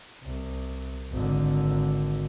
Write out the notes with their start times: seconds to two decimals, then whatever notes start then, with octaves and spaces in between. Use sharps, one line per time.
0.23 C2
1.12 G#1 D3